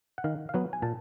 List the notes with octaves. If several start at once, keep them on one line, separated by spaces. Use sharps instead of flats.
F#5
D#3 F5
F5
F#3 B3 F#5
G#5
A#2 A5